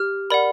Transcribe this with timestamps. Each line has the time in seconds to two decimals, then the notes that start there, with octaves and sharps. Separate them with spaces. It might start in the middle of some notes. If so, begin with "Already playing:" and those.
Already playing: G4 F6
0.30 A#4 D5 F#5 B5